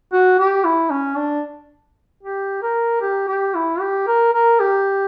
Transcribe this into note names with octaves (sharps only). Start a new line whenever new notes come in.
F#4
G4
E4
C#4
D4
G4
A#4
G4
G4
E4
G4
A#4
A#4
G4